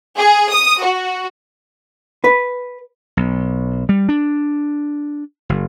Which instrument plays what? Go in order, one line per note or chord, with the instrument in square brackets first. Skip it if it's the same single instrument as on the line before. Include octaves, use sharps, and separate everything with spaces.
[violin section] G#4
D#6
F#4
[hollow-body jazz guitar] B4
[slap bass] B1
G3
D4
F#1